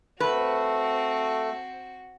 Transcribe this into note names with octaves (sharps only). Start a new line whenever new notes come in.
A3 C4 F#4 B4